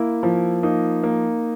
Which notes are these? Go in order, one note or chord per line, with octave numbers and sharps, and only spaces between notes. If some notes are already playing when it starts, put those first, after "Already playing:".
Already playing: A#3 E4
F3
A#3 D#4
A#3